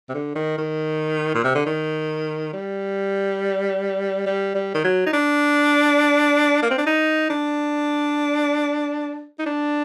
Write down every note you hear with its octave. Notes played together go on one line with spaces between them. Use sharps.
C3
D3
D#3
D#3
A#2
C3
D3
D#3
G3
G3
G3
D#3
F#3
D#4
D4
A#3
C4
D4
D#4
D4
D#4
D4